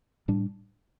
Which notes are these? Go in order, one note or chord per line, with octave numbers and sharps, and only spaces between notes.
A2 G3 D4